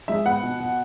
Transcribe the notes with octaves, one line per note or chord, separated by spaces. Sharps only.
G#3 E5
B3 F#5
B2
B2